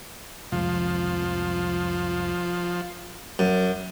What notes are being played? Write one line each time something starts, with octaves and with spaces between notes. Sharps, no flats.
C2 F2 F3 G#3
F#2